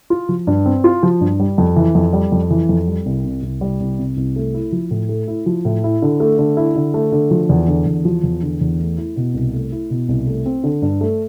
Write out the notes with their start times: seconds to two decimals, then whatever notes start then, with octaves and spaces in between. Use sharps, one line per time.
0.10 F4
0.29 F3
0.47 G2
0.66 C4
0.84 F4
1.03 F3
1.21 G2
1.40 G3
1.58 F2
1.76 E3
1.95 F2
2.13 G3
2.32 F2
2.50 E3
2.69 F2
2.88 G3
3.06 C2
3.24 C3
3.43 C2
3.61 G3
3.80 C2
3.98 C3
4.17 C2
4.36 A3
4.54 E4
4.72 F3
4.91 A2
5.09 A3
5.28 E4
5.46 F3
5.65 A2
5.84 E4
6.02 D3
6.20 A3
6.38 D3
6.57 E4
6.76 D3
6.94 A3
7.12 D3
7.31 F3
7.49 E2
7.68 D3
7.86 E2
8.05 F3
8.23 E2
8.42 D3
8.61 E2
8.79 A3
8.98 E4
9.16 B2
9.34 C2
9.53 A3
9.72 E4
9.90 B2
10.09 C2
10.27 A3
10.46 C4
10.64 D3
10.82 G2
11.01 A3